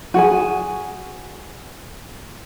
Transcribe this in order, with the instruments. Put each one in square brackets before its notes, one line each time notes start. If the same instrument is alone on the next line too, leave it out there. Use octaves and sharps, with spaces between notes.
[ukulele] F#4 G#4 G#5